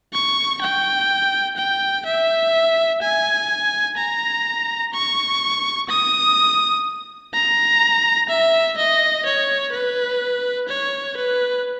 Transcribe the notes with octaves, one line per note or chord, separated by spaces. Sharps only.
C#6
G5
G5
E5
G#5
A#5
C#6
D#6
A#5
E5
D#5
C#5
B4
C#5
B4